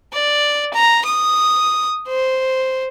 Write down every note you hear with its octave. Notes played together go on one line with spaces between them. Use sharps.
D5
A#5
D#6
C5